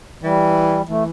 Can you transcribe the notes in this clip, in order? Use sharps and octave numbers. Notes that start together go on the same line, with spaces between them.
E3 G3
E3 A3